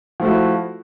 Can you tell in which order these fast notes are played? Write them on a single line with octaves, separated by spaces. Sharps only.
F3 A3 F#4 E4